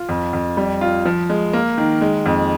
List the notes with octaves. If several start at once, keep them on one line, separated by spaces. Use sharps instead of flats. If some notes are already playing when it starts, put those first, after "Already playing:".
Already playing: F4
F2
F2
G3
F4
F3
G#3
A#3
D#3
G#3
F2